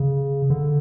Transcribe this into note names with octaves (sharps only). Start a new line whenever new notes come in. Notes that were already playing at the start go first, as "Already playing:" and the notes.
Already playing: C#3
D3